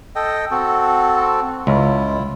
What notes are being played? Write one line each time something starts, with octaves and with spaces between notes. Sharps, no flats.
A4 D#5 G5
C4 F#4 A4
C#2 E4 F4